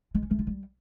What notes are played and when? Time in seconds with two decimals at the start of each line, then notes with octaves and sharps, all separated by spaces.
0.15 G#3
0.23 C#4
0.31 A3
0.39 F4
0.47 G3